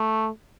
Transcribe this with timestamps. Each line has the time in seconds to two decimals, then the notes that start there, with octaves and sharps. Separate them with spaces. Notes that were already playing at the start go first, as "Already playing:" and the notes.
Already playing: A3